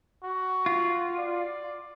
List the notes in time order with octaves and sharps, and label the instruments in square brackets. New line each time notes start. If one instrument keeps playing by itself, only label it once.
[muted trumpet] F#4
[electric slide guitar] F4
[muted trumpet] D5